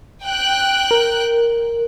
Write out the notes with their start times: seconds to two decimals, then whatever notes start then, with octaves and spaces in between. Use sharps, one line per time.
0.25 G5 F#6
0.91 A#4